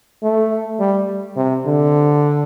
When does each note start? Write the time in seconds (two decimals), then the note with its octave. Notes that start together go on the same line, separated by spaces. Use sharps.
0.23 A3
0.80 G3
1.37 C3
1.66 D3